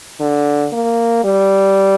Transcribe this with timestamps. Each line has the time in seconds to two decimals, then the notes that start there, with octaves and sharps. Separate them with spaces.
0.20 D3
0.73 A#3
1.24 G3